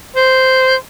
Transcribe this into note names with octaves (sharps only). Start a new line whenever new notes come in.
C5